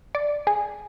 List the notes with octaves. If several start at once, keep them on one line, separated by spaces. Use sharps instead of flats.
D5
G#4